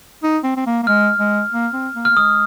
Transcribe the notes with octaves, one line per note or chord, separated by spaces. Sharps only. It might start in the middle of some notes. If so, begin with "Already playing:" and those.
D#4
C4
C4
A#3
A#3
G#3 F6
G#3
A#3
C4
A#3
F6
A#3
G#3 D#6